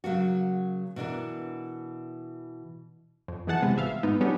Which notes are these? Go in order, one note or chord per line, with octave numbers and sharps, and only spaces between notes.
C#3 F#3 A#3 F#4
B2 E3 D4 A#4
F2
B2 E3 G#4 F#5 A5
C3 G#3 B3
G#1 C3 E5 F5
G#2 B3 D#4
F#3 G3 B3 C#4 D4 G4